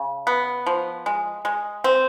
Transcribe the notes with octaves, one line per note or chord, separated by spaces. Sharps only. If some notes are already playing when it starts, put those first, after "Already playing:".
Already playing: C#3
B3
F3
G#3
G#3
C4